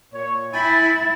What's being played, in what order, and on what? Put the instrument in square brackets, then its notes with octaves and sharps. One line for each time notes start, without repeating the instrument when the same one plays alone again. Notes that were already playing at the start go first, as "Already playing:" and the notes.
[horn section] A#2 C#5
[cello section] E4 [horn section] G5 G#5 B5 [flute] A6